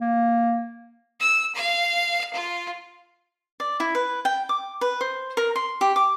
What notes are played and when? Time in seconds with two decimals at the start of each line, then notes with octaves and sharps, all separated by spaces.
0.01 A#3
1.20 E6
1.55 F5
2.34 F4
3.60 D5
3.80 E4
3.95 B4
4.25 G5
4.49 D6
4.81 B4
5.01 C5
5.37 A#4
5.55 C6
5.81 G4
5.96 D6